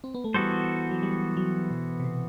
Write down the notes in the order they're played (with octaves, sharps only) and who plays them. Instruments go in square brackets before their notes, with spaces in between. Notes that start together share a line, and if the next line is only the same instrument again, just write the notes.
[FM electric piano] C4
B3
A3
[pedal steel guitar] E3 B3 F#4 A4 C5 [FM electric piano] G3
[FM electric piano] F#3
G3
F#3
B2
C3
B2